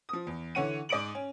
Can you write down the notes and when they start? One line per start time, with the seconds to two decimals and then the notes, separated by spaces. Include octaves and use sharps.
0.09 F3 D#6
0.27 E2
0.55 D3 E3 C#5 F#5 D#7
0.89 G#2 D5 D#6 D7 F#7
1.15 C#4